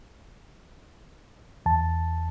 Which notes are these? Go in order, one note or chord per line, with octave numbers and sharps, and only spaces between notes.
E2 A5